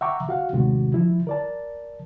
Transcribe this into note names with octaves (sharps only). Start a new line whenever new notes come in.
E5 F#5 G5 A#5 C#6 D6
F#4 F5 F#5
D#2 A2 C3 D#3 G#3 F#4
F3 E4
A#4 D5 A5